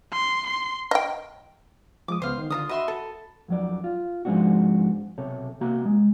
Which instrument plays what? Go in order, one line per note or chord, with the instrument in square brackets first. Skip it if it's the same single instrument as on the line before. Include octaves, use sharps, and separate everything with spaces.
[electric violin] C6
C6
[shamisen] D#5 G5
[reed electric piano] F3 G#3 D#6 [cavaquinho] D6
[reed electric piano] C#2 B3 [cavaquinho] C5 F5
[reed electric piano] D#3
[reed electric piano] D3 [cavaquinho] F4 A#4 D#6
[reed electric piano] F#4 B5 [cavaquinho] D#5 E5 C6
[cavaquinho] A4
[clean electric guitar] F2 F#3 D5
F4
G#2 F3 G#3 C4 D4 F#4
B1 C3 A4 C#5
C3 A#3 F#4 A#5
G#3